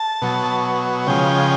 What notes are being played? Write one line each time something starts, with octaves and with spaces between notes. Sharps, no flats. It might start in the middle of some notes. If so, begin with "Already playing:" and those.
Already playing: A5
B2 F#3
C#3 F3 G#3 G5